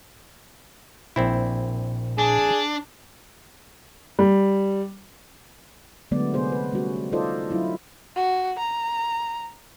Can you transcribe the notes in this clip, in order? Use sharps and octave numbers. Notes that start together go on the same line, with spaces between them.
A#1 A#2 C4 E4
D4 G#4
G3
D3 F#3 G#3 A3 B3 D5
C3 B3 G#4 C5
B4
G3 A3 C#4 F#4
D#4 F4 A4 C5 D5 D#5
F#3 D4 E4 F4
F#4
A#5